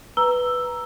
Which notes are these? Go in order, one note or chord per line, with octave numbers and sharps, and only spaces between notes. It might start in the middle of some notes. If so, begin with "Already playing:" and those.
B4 A#5 E6 G7